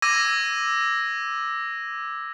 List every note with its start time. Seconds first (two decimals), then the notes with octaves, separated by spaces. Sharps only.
0.02 D6 E6 G#6 A#6 D#7